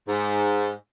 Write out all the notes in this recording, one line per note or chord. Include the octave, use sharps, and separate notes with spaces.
G#2